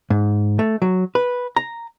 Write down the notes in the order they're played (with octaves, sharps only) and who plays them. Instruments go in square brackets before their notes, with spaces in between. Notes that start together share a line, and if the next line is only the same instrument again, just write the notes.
[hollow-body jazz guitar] G#2
A3
F#3
B4
A#5